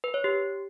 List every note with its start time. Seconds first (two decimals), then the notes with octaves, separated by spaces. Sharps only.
0.04 B4
0.14 C#5
0.24 G4